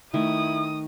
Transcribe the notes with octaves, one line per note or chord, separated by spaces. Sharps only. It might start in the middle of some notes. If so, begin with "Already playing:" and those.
D#3 A3 E4 D#6